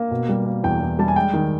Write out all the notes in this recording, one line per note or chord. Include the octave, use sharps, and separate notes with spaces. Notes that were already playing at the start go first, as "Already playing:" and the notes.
Already playing: A#3
B2
G3
A#3
E2 G5
E2
G3 A5
G#5
G#3 G5
D#3